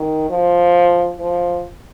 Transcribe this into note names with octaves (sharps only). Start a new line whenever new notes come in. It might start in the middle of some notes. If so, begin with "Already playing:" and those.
Already playing: D#3
F3
F3